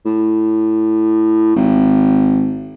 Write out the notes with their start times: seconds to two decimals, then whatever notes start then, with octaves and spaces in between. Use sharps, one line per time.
0.05 A2
1.56 G#1